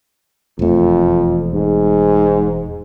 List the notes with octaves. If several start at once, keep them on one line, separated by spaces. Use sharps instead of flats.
E1 F2 A3
G#2